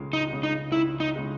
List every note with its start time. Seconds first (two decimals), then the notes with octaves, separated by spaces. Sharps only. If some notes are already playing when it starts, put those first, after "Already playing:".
Already playing: C#2 C#3 G#3
0.13 D#4
0.28 C#3 G#3
0.43 D#4
0.71 C#2 E4
1.00 D#4
1.15 C#3 G#3